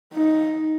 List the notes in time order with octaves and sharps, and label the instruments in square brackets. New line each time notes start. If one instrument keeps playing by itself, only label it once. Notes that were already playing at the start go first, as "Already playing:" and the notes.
[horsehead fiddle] D#4